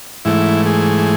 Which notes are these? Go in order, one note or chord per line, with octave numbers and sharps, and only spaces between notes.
G#2 E3 A3 E4
G#4